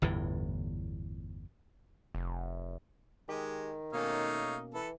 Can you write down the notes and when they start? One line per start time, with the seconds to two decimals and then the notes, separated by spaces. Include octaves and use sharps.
0.02 G1 E2 A2 E3
2.15 F1
3.29 D#3 G#3 G4
3.93 B2 A3 A#3 C#4 D#4 C#5 F5
4.74 E3 A4 B4